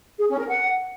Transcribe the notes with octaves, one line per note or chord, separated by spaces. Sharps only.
G#4
C#4
A#4
F#5